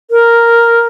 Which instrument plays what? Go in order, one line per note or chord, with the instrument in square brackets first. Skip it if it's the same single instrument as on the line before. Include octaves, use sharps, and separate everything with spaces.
[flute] A#4